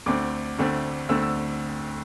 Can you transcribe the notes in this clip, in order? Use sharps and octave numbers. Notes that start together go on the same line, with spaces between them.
D2 D3 A3 C4 D6
D2 D3 A3 C4
D2 D3 A3 C4 E6
E6